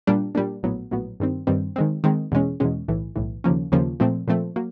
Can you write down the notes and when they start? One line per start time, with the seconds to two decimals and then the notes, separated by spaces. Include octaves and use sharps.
0.07 A#2 G3 A#3 D4
0.35 A#2 G3 A#3 D4
0.63 A#1 A2 F#3 B3
0.91 A#1 A2 F#3 B3
1.20 G2 D#3 G3 C4
1.47 G2 D#3 G3 C4
1.76 D#3 G#3 C4
2.04 D#3 G#3 C4
2.32 E2 B2 G#3 C#4
2.60 E2 B2 G#3 C#4
2.88 B1 A2 E3
3.16 B1 A2 E3
3.44 D#2 C#3 F3 A#3 C#4
3.72 D#2 C#3 F3 A#3 C#4
4.00 A#2 F3 A3 C4
4.28 A#2 F3 A3 C4
4.56 F#3 A#3